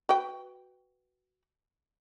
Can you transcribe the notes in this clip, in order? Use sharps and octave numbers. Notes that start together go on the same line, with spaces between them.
F#4 B4 G5